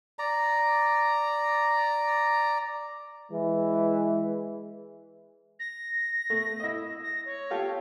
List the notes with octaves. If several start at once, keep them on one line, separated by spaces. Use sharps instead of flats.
D5 A#5
E3 G#3
A#6
A3
E4 D#5
A#6
C#5
F4 G4 A4